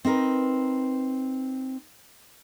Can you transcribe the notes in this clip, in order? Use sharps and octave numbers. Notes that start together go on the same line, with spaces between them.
C4 D#4 A#4 B4